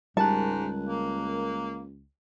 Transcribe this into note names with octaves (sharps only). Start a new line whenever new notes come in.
C#2 G#2 G3 A#4 A5 F#6
A#3